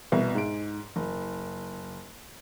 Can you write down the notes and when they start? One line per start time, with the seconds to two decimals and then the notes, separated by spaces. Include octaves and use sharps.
0.12 C2 B2
0.35 G#2 D7
0.96 F#1